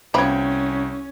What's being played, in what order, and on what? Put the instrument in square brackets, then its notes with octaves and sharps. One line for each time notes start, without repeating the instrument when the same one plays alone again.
[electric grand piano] C2 G5 G#6 [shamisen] F3 B3 B5 [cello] C#4